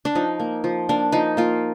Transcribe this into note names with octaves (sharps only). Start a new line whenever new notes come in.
D4
F3 D#4
A#3
F3
A#3 D4
F3 D#4
A#3 F4